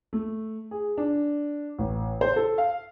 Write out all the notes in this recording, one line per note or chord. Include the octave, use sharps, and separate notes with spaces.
A3
G#4
D4
A1
C5
A4
F5